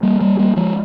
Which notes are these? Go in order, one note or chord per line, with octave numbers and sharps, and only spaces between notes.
G3 A#3
G3 A#3
G3 A#3
F3 G#3